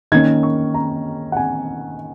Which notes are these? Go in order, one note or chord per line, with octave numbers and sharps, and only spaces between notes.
D#3 A#3 C#4 G#6
C#6
A#5
F#5
G#5